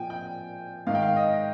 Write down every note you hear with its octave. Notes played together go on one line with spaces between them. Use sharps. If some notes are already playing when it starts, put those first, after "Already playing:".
Already playing: A#2 F3 G5 G#5
G5
G#2 D#3 F5
G5
F5
D#5